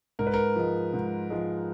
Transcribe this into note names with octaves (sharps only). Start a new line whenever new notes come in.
G#2 A#4
B4
A#4
F3 G#3
G#2
F3 G#3